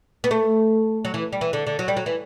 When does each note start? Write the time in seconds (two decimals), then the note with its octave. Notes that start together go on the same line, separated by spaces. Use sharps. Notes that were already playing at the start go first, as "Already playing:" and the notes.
0.24 B3
0.31 A3
1.05 F#3
1.14 E3
1.33 G3
1.41 E3
1.53 D3
1.67 D3
1.79 F#3
1.88 G3
1.97 F#3
2.06 E3